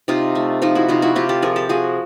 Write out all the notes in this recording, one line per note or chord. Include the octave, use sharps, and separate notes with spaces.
C3 D#4 F4
A3
F3 D#4 F4
E4 F#4
C3 D#4 F4
E4 F#4
C3 F4 G4
G4 A4
F3 G#4 A#4
G4 A4
F3 F#4 G#4